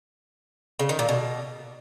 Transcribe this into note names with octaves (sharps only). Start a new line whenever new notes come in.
C#3
D#3
A#2
B2